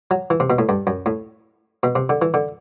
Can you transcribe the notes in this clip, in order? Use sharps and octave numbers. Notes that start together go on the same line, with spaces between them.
F#3
E3
C3
B2
A2
G2
F#2
A2
B2
C3
D3
E3
D3